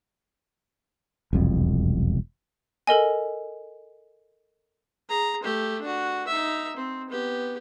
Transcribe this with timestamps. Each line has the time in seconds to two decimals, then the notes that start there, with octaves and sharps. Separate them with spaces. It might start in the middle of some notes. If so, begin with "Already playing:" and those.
1.33 E1 C2 F2
2.87 A4 A#4 D#5 G#5
5.09 G#4 A#5
5.43 A3 G4
5.82 D4 F#4
6.27 D#4 E5
6.77 C4
7.10 B3 G4